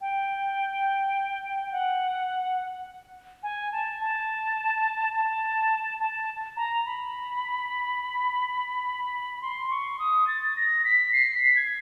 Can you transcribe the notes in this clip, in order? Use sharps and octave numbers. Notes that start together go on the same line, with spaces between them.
G5
F#5
G#5
A5
A5
A5
A5
A#5
B5
C6
C#6
D#6
A6
A#6
B6
C7
B6
G#6